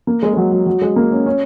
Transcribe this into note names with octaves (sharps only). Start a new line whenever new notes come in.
A#3
G#3
G#3
F#3
F#3
F#3
G#3
A#3
C#4
C#4